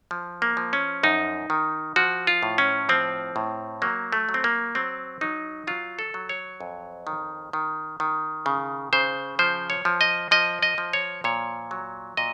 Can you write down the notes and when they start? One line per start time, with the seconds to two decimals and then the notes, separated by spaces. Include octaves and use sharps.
0.11 F3
0.42 A#3
0.57 F3
0.73 C#4
1.03 F#2 D#4
1.50 D#3
1.96 F3 F#4
2.27 F4
2.43 A2
2.58 C#4
2.89 F3 C4
3.36 A2
3.82 F#3 A#3
4.12 A3
4.29 F#3
4.34 C4
4.44 A#3
4.75 F#3 C4
5.21 F#3 D#4
5.67 F#3 F4
5.99 A4
6.14 F#3
6.29 C#5
6.60 F2
7.07 D#3
7.53 D#3
8.00 D#3
8.46 C#3
8.93 C#3 C5
9.39 F3 C5
9.70 C#5
9.85 F3
10.01 D#5
10.31 F3 D#5
10.63 D#5
10.78 F3
10.93 C#5
11.24 A#2 C#5
11.71 F#3
12.17 A#2 D#5